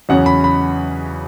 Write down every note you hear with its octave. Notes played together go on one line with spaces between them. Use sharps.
E2 C#3 F#3 C#4 F#5
B5
B5